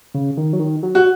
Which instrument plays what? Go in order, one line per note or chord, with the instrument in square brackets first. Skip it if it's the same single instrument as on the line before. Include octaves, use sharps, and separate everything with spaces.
[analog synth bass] C#3
D#3
F#3
D#3
F#3
[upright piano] F#4